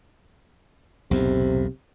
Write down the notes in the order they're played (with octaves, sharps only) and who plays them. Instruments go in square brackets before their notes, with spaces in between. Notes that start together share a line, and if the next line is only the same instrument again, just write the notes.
[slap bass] B1 E2 A2 [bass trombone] C3